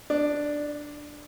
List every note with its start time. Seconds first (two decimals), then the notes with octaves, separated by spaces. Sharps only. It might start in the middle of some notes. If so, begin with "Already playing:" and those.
0.10 D4